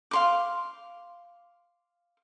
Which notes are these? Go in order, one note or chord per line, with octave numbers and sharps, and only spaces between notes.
F5 C6 D6